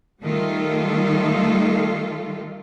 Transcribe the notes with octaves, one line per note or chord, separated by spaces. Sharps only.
D#3 G3 A3 F4 A4